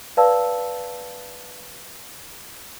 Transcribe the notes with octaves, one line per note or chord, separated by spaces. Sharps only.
B4 D5 F5 A5 E6